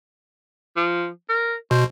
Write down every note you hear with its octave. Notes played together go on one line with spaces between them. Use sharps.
F3
A#4
B2 C5